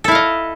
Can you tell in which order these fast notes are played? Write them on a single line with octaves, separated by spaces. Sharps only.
A4 E4 F5 D#5